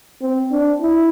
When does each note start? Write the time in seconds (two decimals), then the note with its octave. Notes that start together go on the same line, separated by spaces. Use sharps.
0.22 C4
0.52 D4
0.80 E4